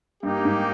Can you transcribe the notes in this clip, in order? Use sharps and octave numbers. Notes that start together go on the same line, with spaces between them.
G2 A#3 D#4 G4
G#2